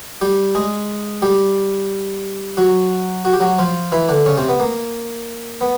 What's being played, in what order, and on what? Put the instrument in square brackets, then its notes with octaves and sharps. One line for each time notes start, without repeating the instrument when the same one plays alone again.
[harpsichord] G3 G4
G#3 G#4
G3 G4
F#3 F#4
F#4
G4
F#3 F#4
F3 F4
E3 E4
D3 D4
C#3 C#4
C3 C4
B3
A#3
B3